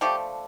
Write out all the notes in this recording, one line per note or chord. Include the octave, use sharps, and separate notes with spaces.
D3 F3 A3 G4